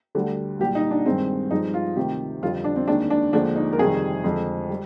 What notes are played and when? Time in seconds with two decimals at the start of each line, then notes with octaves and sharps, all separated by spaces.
0.15 D2 D3 G3
0.60 C2 A#2 G3 G4
0.75 D#4
0.91 D4
1.06 G2 D#3 G#3 C4
1.51 G2 F3 G#3 D#4
1.74 F4
1.96 D2 C3 D#3 G4
2.42 F2 D3 G3 F4
2.64 D4
2.76 C4
2.88 D#2 D#3 G#3 D4
3.10 D4
3.33 D#2 D3 F3 G#3 D4
3.56 D#4
3.73 A#4
3.78 F2 C3 D#3 G3 G#4
4.24 F2 D3 F3 G#3
4.70 G3